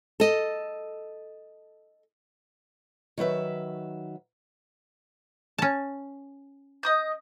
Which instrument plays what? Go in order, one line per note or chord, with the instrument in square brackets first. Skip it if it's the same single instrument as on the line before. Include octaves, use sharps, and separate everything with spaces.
[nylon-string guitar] A4 D#5
[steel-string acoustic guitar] D#3 F#3 B4 E5
[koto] C#4 A5
[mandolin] D#5 D#6 G6